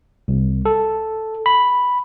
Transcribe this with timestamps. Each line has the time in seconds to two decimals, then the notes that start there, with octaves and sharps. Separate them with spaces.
0.28 C2
0.66 A4
1.46 B5